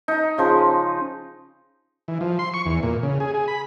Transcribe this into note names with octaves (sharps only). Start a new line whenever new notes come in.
D#4 A#5
C#3 F3 C6
E3
F3
C6
C#6
E2
A#2
C#3
G#4
G#4
B5